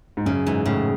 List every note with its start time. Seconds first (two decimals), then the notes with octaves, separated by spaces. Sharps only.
0.17 G#2
0.26 F#2 C#3
0.46 G#2 E3
0.66 A2 C#3